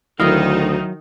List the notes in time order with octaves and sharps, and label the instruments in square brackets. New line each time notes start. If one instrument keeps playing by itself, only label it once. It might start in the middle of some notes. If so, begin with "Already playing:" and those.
[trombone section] D2 [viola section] D#3 D#4 [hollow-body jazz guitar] F#3 E4 [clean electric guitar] D#5 F5